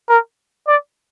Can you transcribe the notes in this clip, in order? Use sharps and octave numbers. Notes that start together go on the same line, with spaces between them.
A#4
D5